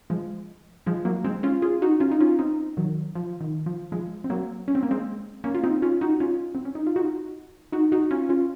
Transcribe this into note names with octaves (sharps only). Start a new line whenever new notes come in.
F3 G#3
F3 G#3
F#3 A#3
G#3 C4
C#4 F4
F4 G#4
D#4 F#4
C#4 F4
D#4
C#4 F4
C4 D#4
D#3 F#3
F3
D#3
F3
F3 G#3
C4
F#3 A#3
C#4
C4
A#3
G#3 C4
A#3 C#4
F4
C4 D#4
C#4 F4
D#4 F#4
C#4 F4
C4
C#4
D#4
F4
D#4 F#4
D#4 F#4
D#4 F#4
C#4 F4
C#4 F4